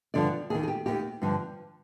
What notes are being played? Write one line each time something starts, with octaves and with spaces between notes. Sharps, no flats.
G2 D3 F3 D5
D#2 D#3 G#4
G#4
G4
D#2 D#3 G4
G2 D3 F3